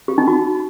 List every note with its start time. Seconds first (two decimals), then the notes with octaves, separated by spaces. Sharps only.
0.08 G4
0.18 D#4
0.28 F#4